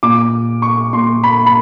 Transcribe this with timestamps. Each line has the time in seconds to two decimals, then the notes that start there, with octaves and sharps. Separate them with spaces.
0.03 A#2 D6
0.62 C#6
0.93 A#2 C6
1.24 B5
1.46 B5